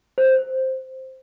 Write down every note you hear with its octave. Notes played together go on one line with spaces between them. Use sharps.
C5